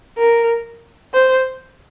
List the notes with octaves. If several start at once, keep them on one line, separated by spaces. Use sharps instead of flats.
A#4
C5